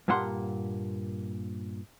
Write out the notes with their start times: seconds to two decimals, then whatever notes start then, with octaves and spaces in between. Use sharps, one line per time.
0.08 G2 A#2 A#3 F#5 C6